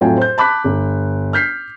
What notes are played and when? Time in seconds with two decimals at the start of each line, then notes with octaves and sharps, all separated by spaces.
0.01 F2 A2 F#3 F4 G5 G#5
0.17 C5 G6
0.38 A5 B5 D6 F#6 B6
0.64 G1
1.33 F6 G6 B6 C7